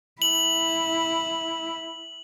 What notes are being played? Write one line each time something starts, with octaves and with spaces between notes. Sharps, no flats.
E4 F#7